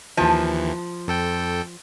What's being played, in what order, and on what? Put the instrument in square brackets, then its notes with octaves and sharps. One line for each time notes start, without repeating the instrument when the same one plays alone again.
[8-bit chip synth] D#2 E3 [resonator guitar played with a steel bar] F3
[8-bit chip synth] F2 A4 G5